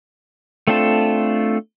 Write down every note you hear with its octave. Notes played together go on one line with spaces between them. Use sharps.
A3 C4 D4 F4 A4